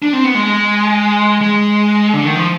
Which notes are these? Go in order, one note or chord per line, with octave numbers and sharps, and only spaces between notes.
D4
C4
B3
G#3
G#3
D3
D#3
F3